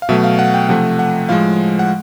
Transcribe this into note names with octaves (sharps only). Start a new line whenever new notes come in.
F5
B2 F#3 A3 E5
F5
F#5
G5
C3 F3 A3 F#5
F#5
A2 F3 G#3 F5
F#5